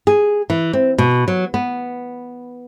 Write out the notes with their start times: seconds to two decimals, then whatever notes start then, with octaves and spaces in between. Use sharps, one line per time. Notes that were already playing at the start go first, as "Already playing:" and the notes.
0.07 G#4
0.50 E3
0.73 C4
0.98 B2
1.28 F#3
1.54 B3